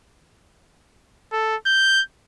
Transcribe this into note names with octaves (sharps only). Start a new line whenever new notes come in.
A4
G6